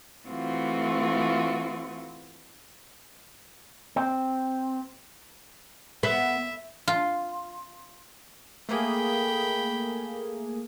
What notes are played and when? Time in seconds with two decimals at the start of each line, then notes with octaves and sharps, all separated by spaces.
0.27 E3 A3 C4 F4 F#4
3.96 C4
6.03 B3 E5
6.88 F4
8.69 A3 A#3 G#4 G5 B5